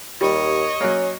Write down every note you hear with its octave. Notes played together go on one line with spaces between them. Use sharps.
D#2 G3 C#5 D#5
F#3 A#3 C#4